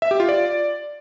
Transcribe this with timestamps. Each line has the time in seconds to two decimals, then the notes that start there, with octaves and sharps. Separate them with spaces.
0.02 E5
0.11 G4
0.20 F4
0.29 D5